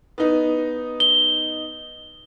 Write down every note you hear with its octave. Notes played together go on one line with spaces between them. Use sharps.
B3 D#4
G7